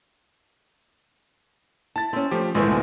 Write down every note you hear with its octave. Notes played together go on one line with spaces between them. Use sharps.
E4 A5 A6
C4 C#4 E4
F3 A3 G4
G#1 A#2 E3 G#3 A3 B4 C5
D2 B2